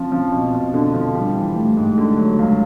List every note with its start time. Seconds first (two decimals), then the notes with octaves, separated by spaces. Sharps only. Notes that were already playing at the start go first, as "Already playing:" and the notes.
Already playing: F3 C4 C#4
0.12 F3
0.32 B2
0.53 B2
0.74 D3 D4
0.94 F3
1.15 G3
1.35 E3
1.56 G3 A3
1.77 G#2
1.98 D3
2.18 F#3
2.38 C#2 G#3